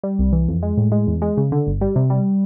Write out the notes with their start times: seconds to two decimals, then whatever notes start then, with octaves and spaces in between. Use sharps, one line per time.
0.03 G3
0.19 C2
0.33 E3
0.48 F2
0.63 G#3
0.77 A2
0.92 G#3
1.07 E2
1.22 G#3
1.37 C#3
1.52 D3
1.67 G1
1.81 G3
1.96 C3
2.10 G3